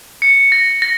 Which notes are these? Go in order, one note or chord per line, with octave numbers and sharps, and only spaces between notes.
C#7
A#6
A#6